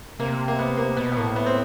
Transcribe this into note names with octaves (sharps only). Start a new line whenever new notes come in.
C3 A#3
A#3
B3
A#3
B2 B3
B3
A2 A#3
B3
C4